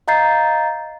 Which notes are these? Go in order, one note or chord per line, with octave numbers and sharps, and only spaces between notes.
D#5 F5 A#5 G6 A6 C7